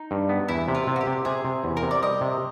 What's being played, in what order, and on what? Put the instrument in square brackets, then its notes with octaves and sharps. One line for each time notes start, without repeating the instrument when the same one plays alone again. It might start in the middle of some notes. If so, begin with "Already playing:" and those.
Already playing: [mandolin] D#4
[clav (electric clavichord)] G2
B3
[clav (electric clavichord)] E2 [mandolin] E4
[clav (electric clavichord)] C3
[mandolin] F4
[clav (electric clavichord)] C3
[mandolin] F#4
G4
[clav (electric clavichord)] C3
[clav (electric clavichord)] C3 [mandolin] G#4
[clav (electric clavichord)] C3
E2
[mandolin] A#4
[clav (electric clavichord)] C3
[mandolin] D5
[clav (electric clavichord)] G3 [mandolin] D#5
[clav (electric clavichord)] C3